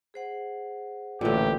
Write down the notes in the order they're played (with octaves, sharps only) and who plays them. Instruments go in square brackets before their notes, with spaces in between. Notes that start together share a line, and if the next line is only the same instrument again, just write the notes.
[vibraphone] G#4 C5 F#5
[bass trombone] A1 [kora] A#2 D3 [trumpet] G4